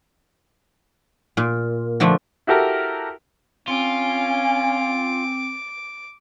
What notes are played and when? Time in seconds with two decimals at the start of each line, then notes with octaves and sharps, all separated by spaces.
1.37 A#2
2.00 D3 F3 A3 D4
2.47 E4 F#4 G4 A4 A#4
3.68 C4 C#4 F4 G#5 D6